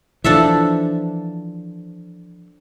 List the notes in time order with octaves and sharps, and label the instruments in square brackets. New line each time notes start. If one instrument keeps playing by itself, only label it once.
[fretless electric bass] E3 F3 [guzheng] D4 A4 E5